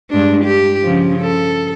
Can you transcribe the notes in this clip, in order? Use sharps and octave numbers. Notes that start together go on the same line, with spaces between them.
G2 G#3 D4
G4
C#3 F3
A4